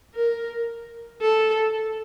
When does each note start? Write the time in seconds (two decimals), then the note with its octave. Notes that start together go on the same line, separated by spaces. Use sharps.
0.15 A#4
1.22 A4